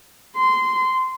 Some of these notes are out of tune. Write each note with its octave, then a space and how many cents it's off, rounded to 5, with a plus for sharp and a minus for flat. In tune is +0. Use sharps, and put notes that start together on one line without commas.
C6 -15